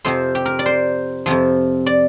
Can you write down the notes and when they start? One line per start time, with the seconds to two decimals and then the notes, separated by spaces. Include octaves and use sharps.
0.05 F2 C3 F3 C4 C5
0.35 G4
0.46 A#4
0.59 D5
0.66 C5
1.26 F2 C3 F3
1.86 D5